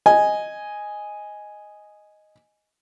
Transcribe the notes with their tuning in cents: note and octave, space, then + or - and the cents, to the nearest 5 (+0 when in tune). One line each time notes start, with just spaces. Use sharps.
D#5 +0 G#5 +0